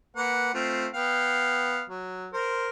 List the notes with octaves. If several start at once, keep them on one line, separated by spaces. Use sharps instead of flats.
A#3 B4 F#5
A3 C4 F4
B3 F5 G5
F#3
A#4 C5